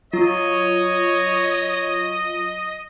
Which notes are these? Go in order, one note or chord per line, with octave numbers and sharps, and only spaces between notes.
F#3 F4 C#5 D#5